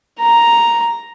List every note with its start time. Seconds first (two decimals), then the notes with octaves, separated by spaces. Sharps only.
0.20 A#5